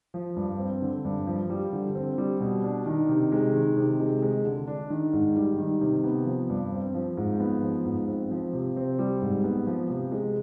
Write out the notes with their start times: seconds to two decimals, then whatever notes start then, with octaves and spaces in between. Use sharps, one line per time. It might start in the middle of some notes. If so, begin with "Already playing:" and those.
0.14 F3
0.36 G2
0.59 C4
0.82 D3
1.05 G2
1.27 F3
1.50 G3
1.73 D3
1.95 C4
2.18 G3
2.40 B2
2.64 D4
2.86 D#3
3.09 C3
3.32 G#3
3.54 D#3
3.76 C3
4.00 G#3
4.22 G#3
4.44 D3
4.68 D4
4.90 D#3
5.13 G#2
5.36 G3
5.59 D#3
5.81 C3
6.04 B3
6.26 F3
6.50 G2
6.72 C4
6.94 F3
7.17 G#2
7.40 B3
7.62 F3
7.85 G#2
8.08 C4
8.31 F3
8.53 C3
8.76 C4
8.99 G3
9.21 G#2
9.44 B3
9.67 F3
9.90 C3
10.12 G#3